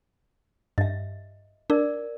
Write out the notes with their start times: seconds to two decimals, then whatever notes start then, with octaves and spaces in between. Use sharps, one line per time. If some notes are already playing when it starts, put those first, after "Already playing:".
0.78 G2 D#5 E5
1.70 D4 A#4 D5